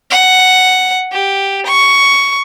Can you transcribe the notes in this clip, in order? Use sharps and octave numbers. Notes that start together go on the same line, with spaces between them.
F#5
G4
C#6